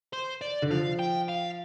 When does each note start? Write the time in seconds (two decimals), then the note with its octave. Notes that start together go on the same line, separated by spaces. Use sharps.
0.13 C5
0.41 D5
0.62 D3
0.70 F3 F5
0.99 G5
1.28 F5